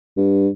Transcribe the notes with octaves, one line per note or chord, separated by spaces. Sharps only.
G2